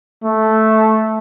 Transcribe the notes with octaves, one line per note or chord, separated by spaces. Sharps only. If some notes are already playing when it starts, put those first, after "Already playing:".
A3